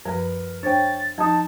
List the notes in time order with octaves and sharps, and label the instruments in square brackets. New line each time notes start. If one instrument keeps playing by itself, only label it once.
[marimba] F#2 F3 [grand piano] A#4 B4
[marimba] D4 C5 [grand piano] C#5 G5 [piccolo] A6
[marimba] F3 D#6 [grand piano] D#4 [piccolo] A5